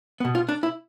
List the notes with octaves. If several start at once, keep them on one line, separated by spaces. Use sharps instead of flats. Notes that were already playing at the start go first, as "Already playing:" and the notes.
B2 B3
F4
D4
E4